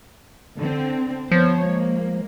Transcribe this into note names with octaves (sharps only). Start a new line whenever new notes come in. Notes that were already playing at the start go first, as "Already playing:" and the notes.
D3 C4
F3 B3 C5 C#5
G#3 A#3